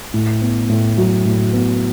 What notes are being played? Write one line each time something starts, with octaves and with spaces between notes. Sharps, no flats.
A2
B3
A2
F#3
A2
B3